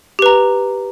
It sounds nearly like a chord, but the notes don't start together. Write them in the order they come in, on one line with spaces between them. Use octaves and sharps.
G4 B4 A#5